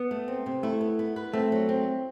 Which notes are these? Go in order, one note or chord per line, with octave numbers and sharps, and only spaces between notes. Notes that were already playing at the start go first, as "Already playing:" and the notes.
Already playing: B3
A3
C4
C3
A3 E4
B3
B3
B4
A3 C4
F#3
C4